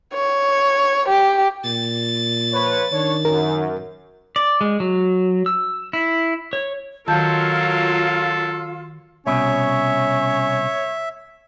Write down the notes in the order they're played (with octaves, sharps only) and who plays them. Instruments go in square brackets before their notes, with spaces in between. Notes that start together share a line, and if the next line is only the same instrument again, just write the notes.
[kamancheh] C#5
G4
[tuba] A#2 [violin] A6
[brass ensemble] F3 B4 C#5
[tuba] D#3 [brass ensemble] D4 C#5
[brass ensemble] F#2 [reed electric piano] A#4
[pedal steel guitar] D5
G#3
F#3
E6
E4
C#5
[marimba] D#3 A5 G6 [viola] F#3 A#4 [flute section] F4 [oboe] A4
[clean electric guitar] C2 B2 [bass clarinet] C#4 [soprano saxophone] C#5 [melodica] E5